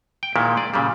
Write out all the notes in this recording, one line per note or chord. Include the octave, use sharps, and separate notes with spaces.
G5
A#2 D#3 G#3 E4
G#4 D5
A#2 C#3 F#3 G3